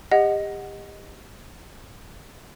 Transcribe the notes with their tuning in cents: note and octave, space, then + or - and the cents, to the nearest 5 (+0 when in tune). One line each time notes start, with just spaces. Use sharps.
G4 +30 D#5 +0 F#5 +0